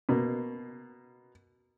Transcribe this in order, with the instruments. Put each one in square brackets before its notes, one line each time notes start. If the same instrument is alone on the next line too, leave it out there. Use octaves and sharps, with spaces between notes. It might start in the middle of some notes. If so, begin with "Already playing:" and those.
[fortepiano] B2 A#3